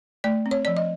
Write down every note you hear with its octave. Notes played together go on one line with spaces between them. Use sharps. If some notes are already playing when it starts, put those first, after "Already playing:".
A3 D5
C4
C#5
F3 D5
D#5